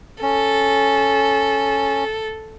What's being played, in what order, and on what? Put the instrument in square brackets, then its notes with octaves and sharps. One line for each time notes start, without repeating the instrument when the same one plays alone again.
[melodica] C#4 [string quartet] A4